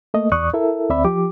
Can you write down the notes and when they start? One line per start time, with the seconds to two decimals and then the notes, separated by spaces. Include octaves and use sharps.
0.14 A3 A#3 D#5
0.32 E2 D5 C#6 D#6 F#6
0.54 E4 A4 A#4 E5
0.90 D2 C4 D5 E5 B5
1.05 F3 G4 D6